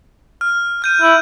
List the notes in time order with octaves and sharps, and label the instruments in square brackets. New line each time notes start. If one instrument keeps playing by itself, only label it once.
[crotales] F6
F6 G6 D#7
[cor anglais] E4 [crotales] F6